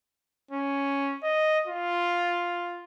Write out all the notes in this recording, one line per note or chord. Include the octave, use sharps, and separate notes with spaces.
C#4
D#5
F4